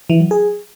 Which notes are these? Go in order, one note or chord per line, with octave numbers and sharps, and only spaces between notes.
E3
F#3
G#4